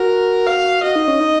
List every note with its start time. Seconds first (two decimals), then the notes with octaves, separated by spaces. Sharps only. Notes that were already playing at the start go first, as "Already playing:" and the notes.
Already playing: F#4 A#4
0.46 F5
0.83 F#4 D#5
0.96 D#4
1.08 C#4
1.20 D#4